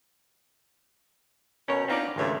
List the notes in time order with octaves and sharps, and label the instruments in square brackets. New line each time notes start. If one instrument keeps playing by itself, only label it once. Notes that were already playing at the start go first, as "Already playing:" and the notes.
[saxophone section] B2 [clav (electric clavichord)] C#4 A#4 C#5
[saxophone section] B3 D4 F4 [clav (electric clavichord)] C4 D#4 D5
[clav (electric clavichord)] G#1 C#2 A3 [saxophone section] G2 D#3 C#5